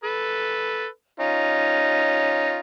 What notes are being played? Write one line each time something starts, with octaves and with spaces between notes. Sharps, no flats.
A4 B4
C#4 D#4 F4